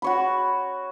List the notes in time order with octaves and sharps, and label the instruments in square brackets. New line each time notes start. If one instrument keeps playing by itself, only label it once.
[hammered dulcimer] F#4 C#5 B5